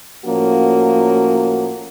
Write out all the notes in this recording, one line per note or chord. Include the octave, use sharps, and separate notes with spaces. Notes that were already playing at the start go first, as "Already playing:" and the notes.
A2 F3 A#3 C#4 F#4